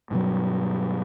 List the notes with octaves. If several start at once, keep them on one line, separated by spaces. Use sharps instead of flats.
G2 B2 F#3